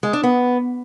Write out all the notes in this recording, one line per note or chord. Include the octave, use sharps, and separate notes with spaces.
G#3
D4
B3